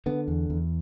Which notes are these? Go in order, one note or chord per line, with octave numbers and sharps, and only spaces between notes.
D3 B3
E2
E2